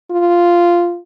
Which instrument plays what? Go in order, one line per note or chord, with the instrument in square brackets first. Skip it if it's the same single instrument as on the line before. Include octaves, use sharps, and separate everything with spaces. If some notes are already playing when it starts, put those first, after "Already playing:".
[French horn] F4